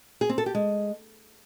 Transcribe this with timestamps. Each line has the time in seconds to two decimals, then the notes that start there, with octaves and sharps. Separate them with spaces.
0.21 G#4
0.29 C4
0.38 A4
0.46 G4
0.55 G#3